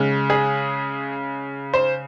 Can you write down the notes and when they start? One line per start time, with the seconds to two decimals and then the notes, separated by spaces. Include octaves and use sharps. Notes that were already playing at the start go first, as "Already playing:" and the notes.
Already playing: C#3 G#3
0.30 G#4
1.74 C5